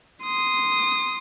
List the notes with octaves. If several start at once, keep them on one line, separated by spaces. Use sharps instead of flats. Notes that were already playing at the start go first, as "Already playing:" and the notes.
C6 D#6